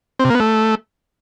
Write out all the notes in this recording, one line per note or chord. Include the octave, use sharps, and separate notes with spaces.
C4
C3
A#3
B3
A3